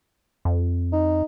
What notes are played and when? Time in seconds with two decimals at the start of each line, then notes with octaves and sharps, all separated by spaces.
0.45 F2
0.93 D#4